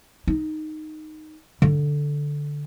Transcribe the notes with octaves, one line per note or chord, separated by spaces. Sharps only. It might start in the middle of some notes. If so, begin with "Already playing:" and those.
D#4
D3